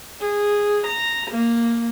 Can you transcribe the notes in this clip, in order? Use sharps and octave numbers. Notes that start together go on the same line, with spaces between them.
G#4
A#5
A#3